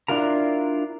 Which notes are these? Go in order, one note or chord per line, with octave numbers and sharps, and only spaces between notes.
D4 E4 F4 A#4 A#5